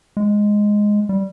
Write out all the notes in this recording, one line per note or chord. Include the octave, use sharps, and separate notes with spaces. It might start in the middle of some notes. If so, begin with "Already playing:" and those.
G#3
G3